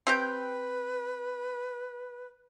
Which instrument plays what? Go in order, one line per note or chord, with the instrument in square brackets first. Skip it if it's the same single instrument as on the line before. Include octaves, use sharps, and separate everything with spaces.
[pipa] C4 G4 G5 [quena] B4